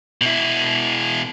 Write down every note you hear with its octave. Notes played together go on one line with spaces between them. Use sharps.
B2 E4